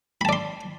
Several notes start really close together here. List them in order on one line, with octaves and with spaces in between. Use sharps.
B5 A5 D5 C6